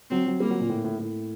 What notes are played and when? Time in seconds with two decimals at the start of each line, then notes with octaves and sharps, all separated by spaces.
0.10 F#3 C4
0.26 F#3
0.40 G3 A#3
0.50 F#3
0.60 A#2
0.69 A2
0.84 A2
0.99 A2